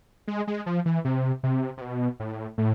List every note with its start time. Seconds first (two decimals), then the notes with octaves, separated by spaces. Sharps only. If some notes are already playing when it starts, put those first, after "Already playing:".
0.28 G#3
0.47 G#3
0.66 F3
0.86 E3
1.05 C3
1.43 C3
1.77 C3
1.81 B2
2.20 A2
2.58 A2